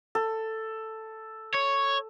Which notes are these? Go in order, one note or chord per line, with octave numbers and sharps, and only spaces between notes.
A4
C#5